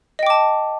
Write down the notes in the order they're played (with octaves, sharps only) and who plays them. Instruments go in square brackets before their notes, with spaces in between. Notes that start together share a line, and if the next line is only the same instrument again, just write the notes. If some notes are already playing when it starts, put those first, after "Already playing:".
[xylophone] D#5
G5
D6
A5